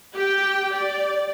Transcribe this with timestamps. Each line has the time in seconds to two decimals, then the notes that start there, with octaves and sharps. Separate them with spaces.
0.13 G4 G5
0.72 D5